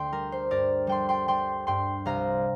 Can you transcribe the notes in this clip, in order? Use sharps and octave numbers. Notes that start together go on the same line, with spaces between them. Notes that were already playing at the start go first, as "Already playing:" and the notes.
Already playing: D2 D3 G5 C6
G3 A#4
C5
G2 A#4 D5
G3 G5 C6
G5 C6
G3 G5 C6
G2 G5 C6
C2 F5 A#5